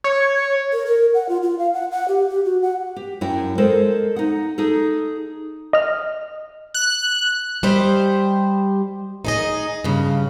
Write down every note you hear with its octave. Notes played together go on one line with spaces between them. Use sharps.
C#5
A#4
A#4
F#5
F4
F4
F5
F#5
F#5
G4
G4
F#4
F#5
G4
F#2 C#4 E4 C#5 G5
G#3 A4 A#4 C5
D#4 F#5
D#4 G#4 A4
D#5 F6
F#6
G3 G4 C5 D#5
D#4 G#4 D#5
G2 C#3